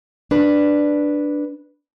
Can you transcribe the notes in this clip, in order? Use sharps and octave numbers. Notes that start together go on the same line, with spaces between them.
D4 B4